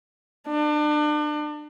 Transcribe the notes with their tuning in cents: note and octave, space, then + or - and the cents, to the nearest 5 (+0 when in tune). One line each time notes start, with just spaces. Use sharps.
D4 +35